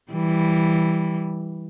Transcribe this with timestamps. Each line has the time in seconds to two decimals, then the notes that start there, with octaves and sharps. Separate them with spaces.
0.13 E3 G3